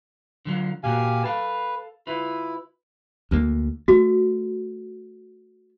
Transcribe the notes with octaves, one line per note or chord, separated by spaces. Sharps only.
D3 F#3 F4
A#2 A#3 F#4 G4 F5 G#5
A4 B4 F5
E4 F4 B4
D2 A#3
A3 F#4